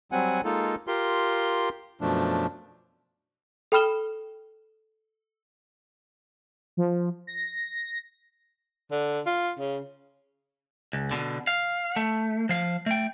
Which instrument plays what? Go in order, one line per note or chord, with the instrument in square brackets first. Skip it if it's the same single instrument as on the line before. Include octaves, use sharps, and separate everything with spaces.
[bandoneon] F#3 G3 C4 F#5 G#5
G#3 A#3 D#4 F4 A4
F4 G4 A#4 C6
F#2 B2 F3 A3 D4
[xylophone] A4 G5 B5 F6 E7 G7
[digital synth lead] F3
A#6
[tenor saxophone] D3
F4
C#3
[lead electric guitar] C#2
B2 D3
F5
A3
F3 F5
A3 G5